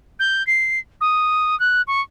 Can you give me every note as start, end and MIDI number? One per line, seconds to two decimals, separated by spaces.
0.20 0.45 91
0.47 0.80 96
1.01 1.58 87
1.60 1.82 90
1.87 2.01 85